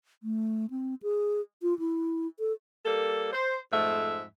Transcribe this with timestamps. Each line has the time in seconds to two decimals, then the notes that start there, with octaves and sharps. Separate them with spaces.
0.23 A3
0.70 C4
1.03 G#4
1.62 F4
1.79 E4
2.39 A4
2.86 G3 A#3 A4
3.33 C5
3.72 F2 G#2 A3 E5